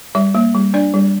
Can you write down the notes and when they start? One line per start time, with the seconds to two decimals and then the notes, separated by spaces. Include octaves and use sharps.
0.15 G3 E5
0.35 A#3
0.54 G3
0.74 D4 D5
0.94 G3